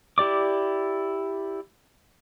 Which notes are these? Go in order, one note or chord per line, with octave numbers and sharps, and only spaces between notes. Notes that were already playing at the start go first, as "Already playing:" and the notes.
E4 G4 D5 D6